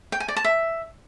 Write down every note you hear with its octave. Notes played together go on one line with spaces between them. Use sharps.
G5
G#5
D5
A5
E5